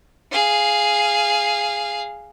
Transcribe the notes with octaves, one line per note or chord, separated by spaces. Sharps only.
G#4 F5